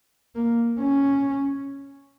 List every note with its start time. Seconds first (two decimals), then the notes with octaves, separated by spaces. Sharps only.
0.36 A#3
0.81 C#4